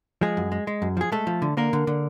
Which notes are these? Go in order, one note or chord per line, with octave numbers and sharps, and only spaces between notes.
F3 G#3 G#4
F#2
G#3
G#3
F#2
F3 G#4
G#3 A3 A4
F3
D3
D3 A#3 A#4
D3
D3